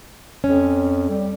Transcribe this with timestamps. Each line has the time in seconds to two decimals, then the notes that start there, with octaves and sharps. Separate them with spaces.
0.44 F2 C#4
1.09 G3